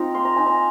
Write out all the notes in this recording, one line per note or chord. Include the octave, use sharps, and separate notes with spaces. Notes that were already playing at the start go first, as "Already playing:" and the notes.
Already playing: C4 D#4 F4
A#3 C6
A#5
D#4 G#5
A#5